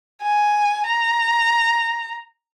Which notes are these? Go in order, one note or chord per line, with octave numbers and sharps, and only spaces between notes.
G#5
A#5